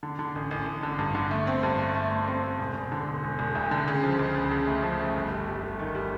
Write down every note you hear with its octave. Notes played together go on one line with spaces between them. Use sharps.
D3
D3
A1
A1
A1
D3
G2
D3
A3
C4
G2
A3
A3
A3
C4
C4
E1
E1
D3
E1
E1
E1
D2
D3
C#3
F3
C#2
C#3
C#3
A3
F3
A3
G1
G3
G3
G1
D#3
G3